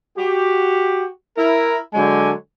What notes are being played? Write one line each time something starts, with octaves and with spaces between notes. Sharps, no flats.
F#4 G4
E4 A#4
D3 F#3 G#3 G#5